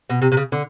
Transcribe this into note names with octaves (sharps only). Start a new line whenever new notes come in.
B2
C3
C3
C#3
D3